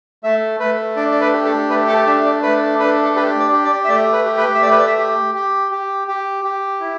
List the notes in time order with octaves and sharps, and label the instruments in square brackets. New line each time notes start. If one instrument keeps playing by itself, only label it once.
[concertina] A3 E5
A3 B4
D4 D5
D5
B4
G4
A4
A3 B4
A4
D4 E5
D5
A3 B4
D4 B4
A4
G4 B4
D5
G4
D5
E5
A3 D5
B4
G4
B4
E5
A3 D5
B4
D5
E5
G4
G4
G4
G4
G4
E4